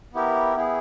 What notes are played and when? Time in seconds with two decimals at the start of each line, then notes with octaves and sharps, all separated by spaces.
0.14 B3 E4 G4 A#4
0.56 B3 E4 G#4